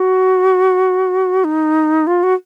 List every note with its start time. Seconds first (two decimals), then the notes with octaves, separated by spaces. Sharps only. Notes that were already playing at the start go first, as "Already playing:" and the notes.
Already playing: F#4
1.44 D#4
2.07 F4
2.23 F#4